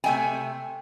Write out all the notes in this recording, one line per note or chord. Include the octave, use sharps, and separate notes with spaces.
C3 A3 E5 G5 G#5